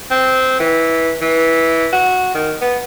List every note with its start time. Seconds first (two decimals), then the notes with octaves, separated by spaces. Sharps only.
0.11 C4
0.60 E3
1.21 E3
1.93 F#4
2.35 D#3
2.61 B3